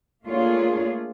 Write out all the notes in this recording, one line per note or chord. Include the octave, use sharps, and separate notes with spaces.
A3 A#3 D4 F4 G#4 C#5